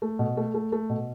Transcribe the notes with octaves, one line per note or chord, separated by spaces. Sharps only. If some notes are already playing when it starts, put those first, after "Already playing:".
A3
B2
A3
A3
A3
B2